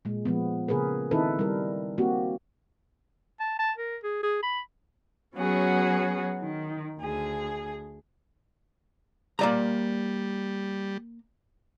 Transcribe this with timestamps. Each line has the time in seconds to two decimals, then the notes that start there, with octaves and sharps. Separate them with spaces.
0.05 A#2 G#3
0.25 F3 G#3 B3
0.68 C#3 A#3 G#4 A#4 B4
1.11 D#3 C4 D#4 E4 A4 B4
1.39 G3 A#4
1.98 A#3 C4 F#4 G4
3.40 A5
3.59 A5
3.78 A#4
4.03 G#4
4.23 G#4
4.43 B5
5.36 F#3 B3 C#4 F#4 G#4
6.40 D#3
6.99 D2 G#4
9.39 G3 A#3 D5 A#5